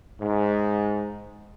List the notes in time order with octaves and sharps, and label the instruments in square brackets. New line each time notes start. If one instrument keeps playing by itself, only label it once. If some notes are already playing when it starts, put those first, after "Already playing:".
[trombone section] G#2